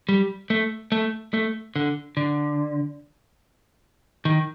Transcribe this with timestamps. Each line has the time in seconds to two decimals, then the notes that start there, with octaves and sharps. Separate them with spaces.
0.09 G3
0.50 A3
0.92 A3
1.34 A3
1.76 D3
2.17 D3
4.25 D#3